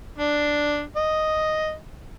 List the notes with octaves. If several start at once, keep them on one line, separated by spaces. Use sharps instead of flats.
D4
D#5